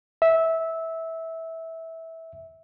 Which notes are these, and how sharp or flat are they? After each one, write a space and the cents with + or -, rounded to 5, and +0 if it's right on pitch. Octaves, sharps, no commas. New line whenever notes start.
E5 -15